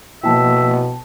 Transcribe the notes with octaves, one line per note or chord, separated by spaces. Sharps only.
B2 F3 A#3 E4 E5 G5 A5